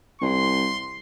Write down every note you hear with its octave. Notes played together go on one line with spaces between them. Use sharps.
C2 C6